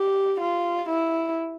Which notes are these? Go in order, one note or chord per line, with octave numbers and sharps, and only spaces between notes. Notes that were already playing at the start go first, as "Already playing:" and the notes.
Already playing: G4
F4
E4